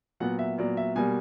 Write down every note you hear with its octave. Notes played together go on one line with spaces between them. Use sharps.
A#2 F#3 B3 F#5
E5
A#2 F#3 B3 D5
E5
B2 G3 A#3 G#5